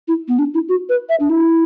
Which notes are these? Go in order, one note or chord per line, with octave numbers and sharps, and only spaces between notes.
E4
B3
D4
E4
F#4
B4
E5
D4
E4